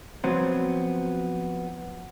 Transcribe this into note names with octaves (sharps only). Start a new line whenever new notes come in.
F3 F#3 B3 C4